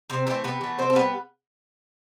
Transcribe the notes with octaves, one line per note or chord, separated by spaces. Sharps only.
C3 C4 C5
E3 A3 C4 C5
C3 B3 B4
E3 A3
C3 C4 C5
A4
G3 B3 B4